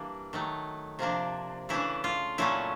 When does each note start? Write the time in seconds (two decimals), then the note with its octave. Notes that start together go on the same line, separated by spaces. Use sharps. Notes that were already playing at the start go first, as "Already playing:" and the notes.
Already playing: E3 G3 A#3 D4
0.33 D#3 F#3 A3
0.99 C3 F3 A#3 D4
1.69 C#3 E3 A3 D4 E4
2.04 F4
2.38 A#2 F#3 A3 C#4 E4